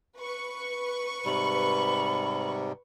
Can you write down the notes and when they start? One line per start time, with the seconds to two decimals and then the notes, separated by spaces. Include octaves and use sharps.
0.17 B4 C#6
1.25 G#2 C3 G3 B5